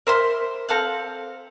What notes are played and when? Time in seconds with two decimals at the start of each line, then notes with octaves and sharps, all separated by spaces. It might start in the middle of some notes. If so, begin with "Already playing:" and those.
0.07 A#4 C5 E5 C6
0.69 C4 A4 F5 F#5